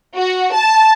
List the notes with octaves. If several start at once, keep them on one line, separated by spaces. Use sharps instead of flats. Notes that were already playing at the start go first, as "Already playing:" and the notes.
F#4
A5